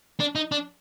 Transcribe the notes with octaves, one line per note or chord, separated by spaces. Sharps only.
D4
D#4
D4